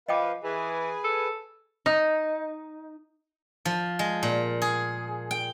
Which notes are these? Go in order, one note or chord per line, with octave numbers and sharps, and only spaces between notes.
F3 B4 D#5 F5 G5 D6
E3 G#4 B4 G#5
A4
D#4
F3
G#3
A#2
G#4
G5